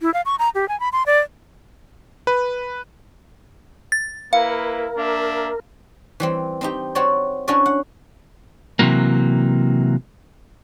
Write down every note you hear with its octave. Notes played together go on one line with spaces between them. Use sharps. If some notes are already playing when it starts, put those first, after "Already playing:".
E4
F5
C#6
A#5
G4
G#5
B5
C6
D5
B4
A6
A#3 E4 A#4 B4 F5
A#3 D4 E5
E3 G3 C4
C4 D#4 G4
C4 F#4 C#5 D5
C#4 D4 E4 F#4 C#5 D5
F#5
C3 E3 F#3 A#3